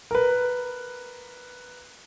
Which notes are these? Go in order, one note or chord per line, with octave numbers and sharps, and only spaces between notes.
A#4 B4